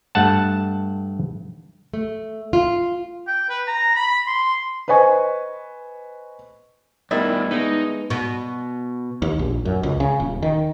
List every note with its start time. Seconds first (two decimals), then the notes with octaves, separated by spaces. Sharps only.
0.15 G2 A3 F#5 A5
1.94 A3
2.53 F4
3.27 G5
3.49 B4
3.67 A#5
3.95 B5
4.27 C6
4.88 B4 C5 D#5 G#5 C#6
7.11 G2 B2 D#3 G3 E4
7.51 G#3 B3 D#4
8.10 B2
9.22 D#2
9.39 A#1
9.65 F#2
9.83 C#2
10.00 C#3
10.20 D#1
10.43 D#3